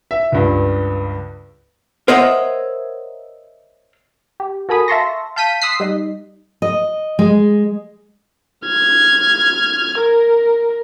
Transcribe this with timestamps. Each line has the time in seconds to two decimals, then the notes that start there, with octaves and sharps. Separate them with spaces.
0.11 E5
0.32 C#2 G2
2.08 A#4 C5 C#5 D#5 E5 F#5
4.40 G4
4.69 F#4 A4 A#4 G#5 B5 D#6
4.88 E5 F5 A5 C6 C#6 A#6
5.36 F5 A5 G6 B6 D#7
5.61 C6 D#6 E6 F#6 B6 C7
5.80 G3 D#4 D#5
6.62 D#5
7.19 G#3
8.67 F6 G#6
9.99 A#4